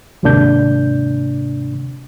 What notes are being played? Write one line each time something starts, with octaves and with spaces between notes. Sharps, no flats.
D#2 G#2 C3 A#3 D4 G6